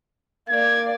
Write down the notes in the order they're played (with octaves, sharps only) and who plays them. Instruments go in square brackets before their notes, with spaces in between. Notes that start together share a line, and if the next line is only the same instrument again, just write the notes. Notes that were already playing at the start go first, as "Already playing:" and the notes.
[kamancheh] A#3 D5 [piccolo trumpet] G#6